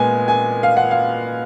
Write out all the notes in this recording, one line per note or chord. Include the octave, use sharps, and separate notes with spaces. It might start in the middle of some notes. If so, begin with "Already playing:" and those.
Already playing: A#2 G#3 B3 G#5
G#5
F5
F#5
F5